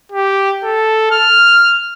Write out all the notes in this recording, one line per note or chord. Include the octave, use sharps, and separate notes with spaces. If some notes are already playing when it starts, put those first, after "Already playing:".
G4
A4
F6